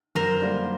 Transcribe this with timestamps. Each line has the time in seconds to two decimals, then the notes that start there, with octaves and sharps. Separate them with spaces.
0.15 F#2 A#4 C5
0.40 D3 G3 A#3